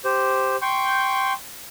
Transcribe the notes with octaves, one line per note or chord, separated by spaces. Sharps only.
G4 C5
G5 C6 C#6 G6